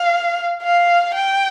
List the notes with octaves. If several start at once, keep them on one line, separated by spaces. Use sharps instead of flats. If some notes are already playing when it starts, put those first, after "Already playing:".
Already playing: F5
F5
G5